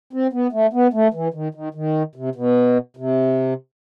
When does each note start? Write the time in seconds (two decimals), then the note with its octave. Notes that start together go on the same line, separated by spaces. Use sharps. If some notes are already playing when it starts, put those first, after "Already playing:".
0.13 C4
0.33 B3
0.53 A3
0.73 B3
0.93 A3
1.14 E3
1.34 D#3
1.54 D#3
1.75 D#3
2.15 C3
2.35 B2
2.97 C3